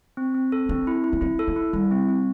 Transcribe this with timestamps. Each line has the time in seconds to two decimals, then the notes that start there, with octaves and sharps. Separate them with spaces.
0.17 C4
0.34 C4
0.52 A4
0.69 C4 D4
0.87 E4
1.04 E4
1.13 B3
1.21 C4 E4
1.39 A4
1.47 B3
1.56 E4
1.73 G3 E4
1.91 C4
2.08 C4